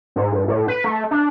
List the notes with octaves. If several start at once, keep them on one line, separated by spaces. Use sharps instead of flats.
G#2
G2
A2
B4
A3
D4